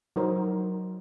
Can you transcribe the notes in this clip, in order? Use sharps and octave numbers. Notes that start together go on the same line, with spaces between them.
F#3 D#4 A#4 C5